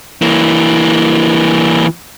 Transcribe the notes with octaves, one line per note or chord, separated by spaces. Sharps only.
E3 A#3